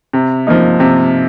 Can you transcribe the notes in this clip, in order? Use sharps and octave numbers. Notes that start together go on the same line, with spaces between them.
C3
F3 A#3 D#4
C3